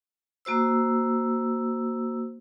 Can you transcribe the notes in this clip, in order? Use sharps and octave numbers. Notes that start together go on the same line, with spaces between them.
A#3 F#4 C5 E6